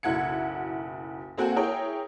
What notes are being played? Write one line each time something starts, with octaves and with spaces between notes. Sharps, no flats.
F#1 B1 E4 F#5 G#6 C#7
A#3 C4 F#4 A4 F#5 G#5
E4 G#4 A#4 C#5 G5